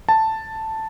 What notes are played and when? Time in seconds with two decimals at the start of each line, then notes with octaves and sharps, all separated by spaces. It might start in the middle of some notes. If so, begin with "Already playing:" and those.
0.09 A5